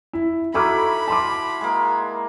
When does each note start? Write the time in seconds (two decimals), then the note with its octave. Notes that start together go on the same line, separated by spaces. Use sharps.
0.13 E4
0.54 D#4 E4 F#4 A4 B5 D6 F6
1.08 A5 C6 D6
1.61 G#3 A#3